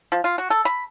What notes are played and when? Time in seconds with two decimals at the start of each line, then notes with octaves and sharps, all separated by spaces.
0.12 F3
0.24 F4
0.38 F#4
0.50 A4
0.65 B5